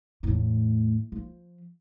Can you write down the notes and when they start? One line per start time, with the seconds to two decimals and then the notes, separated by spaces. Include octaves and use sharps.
0.23 E2 A2
1.12 F3